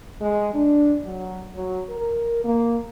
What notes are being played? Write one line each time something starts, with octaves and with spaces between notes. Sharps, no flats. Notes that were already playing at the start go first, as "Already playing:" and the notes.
G#3
D4
F#3
F#3
A#4
A#3